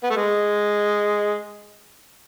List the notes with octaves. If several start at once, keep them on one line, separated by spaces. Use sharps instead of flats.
B3
A3
G#3